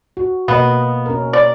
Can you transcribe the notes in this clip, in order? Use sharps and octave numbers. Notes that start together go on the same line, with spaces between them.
F#4
B2 A#3 B3 D#5
C#4 A#4
D5